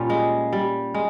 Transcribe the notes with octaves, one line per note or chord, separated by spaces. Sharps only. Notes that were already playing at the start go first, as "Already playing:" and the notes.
Already playing: A#2 G3 C#4 F4
G#3
G3
G#3